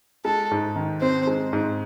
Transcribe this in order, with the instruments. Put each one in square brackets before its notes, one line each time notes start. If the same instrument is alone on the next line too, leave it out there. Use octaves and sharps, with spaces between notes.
[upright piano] G#3 [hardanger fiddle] A4
[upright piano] G#2
D#3
[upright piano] C4 [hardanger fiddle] C5
[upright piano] G#3
G#2